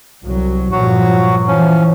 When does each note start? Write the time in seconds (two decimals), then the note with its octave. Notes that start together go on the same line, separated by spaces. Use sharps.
0.25 C2 F#3
0.72 G2 A#2 F3 F#3 F#4
1.48 E3 F3 C#4